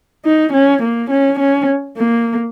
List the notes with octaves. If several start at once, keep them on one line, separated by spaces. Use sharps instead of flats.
D#4
C#4
A#3
C#4
C#4
A#3